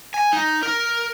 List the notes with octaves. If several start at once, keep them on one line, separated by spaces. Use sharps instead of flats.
G#5
D#4
A#4